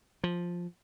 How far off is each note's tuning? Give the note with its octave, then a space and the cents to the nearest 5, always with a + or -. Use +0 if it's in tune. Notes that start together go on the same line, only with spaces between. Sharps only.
F3 +5